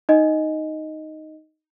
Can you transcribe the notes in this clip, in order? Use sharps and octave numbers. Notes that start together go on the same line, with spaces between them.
D#4 D#5